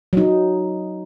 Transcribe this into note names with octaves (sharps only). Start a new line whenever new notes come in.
F#3 D#4